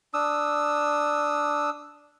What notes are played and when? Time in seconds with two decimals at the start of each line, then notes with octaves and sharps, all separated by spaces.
0.14 D4 D#6 E6